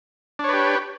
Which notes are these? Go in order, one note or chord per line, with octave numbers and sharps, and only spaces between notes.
D4 G4 B4 C#5